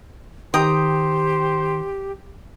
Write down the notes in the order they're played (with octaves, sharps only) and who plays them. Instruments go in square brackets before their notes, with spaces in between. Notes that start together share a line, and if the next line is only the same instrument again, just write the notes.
[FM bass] D#3 [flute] G4 [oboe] C5 [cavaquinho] G5 A#5 D#6